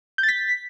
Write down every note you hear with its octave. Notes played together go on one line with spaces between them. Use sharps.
G6
A6
B6